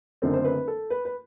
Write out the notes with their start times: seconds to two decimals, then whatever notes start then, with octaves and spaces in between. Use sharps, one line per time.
0.22 F#1 F#2 D3 A3 C4
0.34 C5
0.44 B4
0.68 A4
0.90 B4
1.05 B4